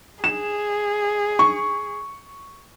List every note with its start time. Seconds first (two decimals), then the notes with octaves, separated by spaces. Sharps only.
0.24 G#4 E7
1.39 C#6